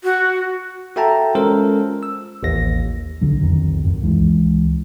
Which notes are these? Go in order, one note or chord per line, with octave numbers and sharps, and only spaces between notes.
F#4
F#4 A4 E5 G5 A5 A#5
G#3 C#4 F4 A4 A#4 C5
E6
A1 D#2 A#6
B1 D3 F#3
F1 B1 F2 D#3
B1 F#2
C#2 E3 G#3